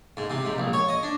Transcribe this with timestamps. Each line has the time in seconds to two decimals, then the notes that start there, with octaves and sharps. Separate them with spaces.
0.17 G#2
0.30 C3
0.45 G#2
0.58 A#1
0.73 C#5
0.89 D#5
1.03 D4